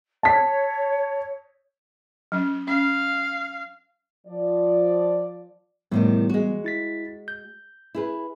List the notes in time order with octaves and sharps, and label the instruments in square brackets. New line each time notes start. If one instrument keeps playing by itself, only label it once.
[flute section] C#5 [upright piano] A5 B6
[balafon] F#3 C#4
[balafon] C#4 [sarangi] F5
[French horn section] F3 D5
[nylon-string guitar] A2 C3 D#3 [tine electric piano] E3 G3 B3
[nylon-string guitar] G#3 F#4
[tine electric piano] E4 A6 B6
G6
[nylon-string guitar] E4 G#4 B4